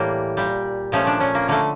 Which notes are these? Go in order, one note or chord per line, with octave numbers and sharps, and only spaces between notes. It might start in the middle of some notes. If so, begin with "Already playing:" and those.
Already playing: A2 E3 G3 A#3
A#2 G3
A#2 F3 A3 C#4
D4
C#4
A#3
D3 A3 A#3